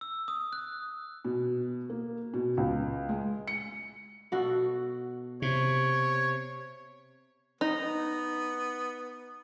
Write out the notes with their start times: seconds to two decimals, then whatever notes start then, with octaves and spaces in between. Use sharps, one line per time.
0.01 E6
0.28 D#6
0.53 F#6
1.25 B2
1.90 A#3
2.34 B2
2.57 C#2
3.09 G#3
3.48 C#7
4.32 B2 F#4 A4
5.42 C3 C#5
7.61 B3 D#4